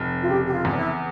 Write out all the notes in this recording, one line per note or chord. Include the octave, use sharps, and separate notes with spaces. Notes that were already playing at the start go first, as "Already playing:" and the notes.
Already playing: F1
F4
C#3 G4
G4
F4
E2
D4
E4